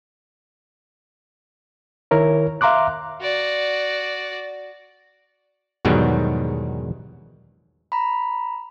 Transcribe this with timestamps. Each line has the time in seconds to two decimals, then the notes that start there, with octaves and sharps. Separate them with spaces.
2.11 D#3 E4 A#4 C#5
2.61 E5 F5 A#5 C6 D6 F#6
3.22 F#4 D5
5.85 E2 G#2 B2 D#3 F#3 G3
7.92 A#5 B5